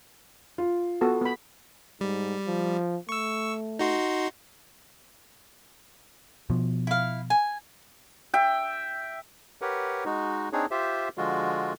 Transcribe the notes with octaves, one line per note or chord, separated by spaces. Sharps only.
F4
B3 F#4 A4
B3 B5
G#2 G3
F3
A3 C#6 E6
D#4 F#4 C6
B2 F3
E4 F5
G#5
E5 G5
G4 A#4 B4 C#5 F#5
G#3 D#4 F#4
C4 D4 D#4 G#4 C#5
F4 G4 C5 E5
D3 F3 G#3 F4 F#4